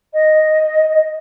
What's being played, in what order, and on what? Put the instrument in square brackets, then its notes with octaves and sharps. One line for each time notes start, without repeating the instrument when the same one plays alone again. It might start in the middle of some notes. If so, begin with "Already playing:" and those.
[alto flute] D#5